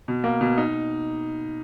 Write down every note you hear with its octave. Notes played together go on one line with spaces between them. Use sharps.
B2
A#3
B2
D#4